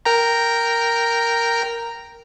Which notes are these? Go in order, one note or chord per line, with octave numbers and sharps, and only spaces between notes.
A#4 G5 A#5